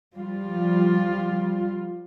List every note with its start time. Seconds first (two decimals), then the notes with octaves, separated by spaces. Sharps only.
0.14 F3 G3 F4